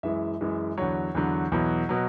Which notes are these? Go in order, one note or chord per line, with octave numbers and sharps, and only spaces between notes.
F#2 E3 G#3 E5
F#2 E3 G#3
E2 D3 F#3 C#5
E2 D3 F#3
E2 B2 F#3
B2 F#3